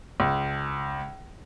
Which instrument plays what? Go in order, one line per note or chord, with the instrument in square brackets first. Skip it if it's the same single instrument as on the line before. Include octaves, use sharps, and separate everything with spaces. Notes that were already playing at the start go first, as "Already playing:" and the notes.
[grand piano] C#2